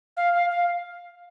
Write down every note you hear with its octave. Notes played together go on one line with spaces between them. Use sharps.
F5
F5
F5